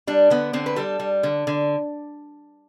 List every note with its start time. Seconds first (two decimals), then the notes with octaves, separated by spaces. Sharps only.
0.07 G3 D4
0.30 D3 B3
0.53 D3 C4
0.66 B4
0.76 G3 A4
1.00 G3
1.23 D3
1.47 D3